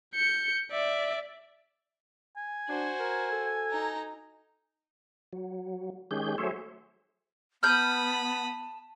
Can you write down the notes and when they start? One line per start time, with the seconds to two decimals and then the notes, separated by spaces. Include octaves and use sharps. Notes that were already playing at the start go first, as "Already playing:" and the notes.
0.15 G6 C#7
0.71 D5 E5
2.37 G#5
2.69 D4 F#4 C5
3.00 A#4
3.31 A4
3.70 D#4 A#5
5.33 F#3
6.11 D#3 G#3 C#4 G4 G#4 G6
6.38 F#3 A3 G#4 C5 C#5 E5
7.63 B3 A5 B5 D#6 F6 G6